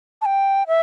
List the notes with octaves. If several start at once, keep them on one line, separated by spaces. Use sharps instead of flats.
A5
G5
E5